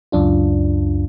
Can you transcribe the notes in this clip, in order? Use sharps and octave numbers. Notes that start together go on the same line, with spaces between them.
C#2 F#2 D4 F4